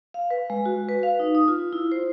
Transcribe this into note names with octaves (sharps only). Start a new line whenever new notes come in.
F5
B4
G#3
F#4
B4
F5
D#4
D#6
F4
E4
C5